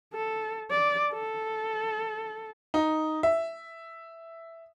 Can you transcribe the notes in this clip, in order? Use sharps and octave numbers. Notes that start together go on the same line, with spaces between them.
A4
D5
A4
D#4
E5